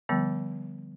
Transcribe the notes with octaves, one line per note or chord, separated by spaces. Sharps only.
D3 F3 G3 B3 G5